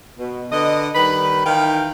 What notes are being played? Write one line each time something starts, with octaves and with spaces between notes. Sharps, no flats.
B2
D3 B4 D#5
D#3 G3 B4 B5
D#3 E3 F5 G5